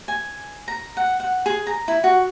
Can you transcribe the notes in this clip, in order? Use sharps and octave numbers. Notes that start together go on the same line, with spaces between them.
G#5
A#5
F#5
F#5
G#4
A#5
E4
F#4